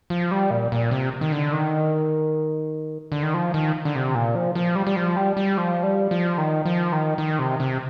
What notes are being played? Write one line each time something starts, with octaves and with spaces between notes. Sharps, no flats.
F3
G3
A#2
A#2
C3
D#3
D3
D#3
D3
D#3
F3
D#3
D3
C3
A#2
F3
F3
G3
G3
F3
G3
G3
F3
G3
F3
D#3
F3
D#3
D#3
C3
C3